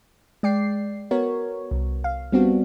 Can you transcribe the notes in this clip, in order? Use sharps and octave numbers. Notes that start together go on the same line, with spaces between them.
G#3 D5 G5 C7
B3 F#4 A#4 C#5
C2
F5
G3 B3 C4 D4 F#4